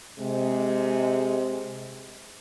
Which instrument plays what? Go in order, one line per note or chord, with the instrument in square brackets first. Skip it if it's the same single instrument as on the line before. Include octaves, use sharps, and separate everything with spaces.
[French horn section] C3 G#3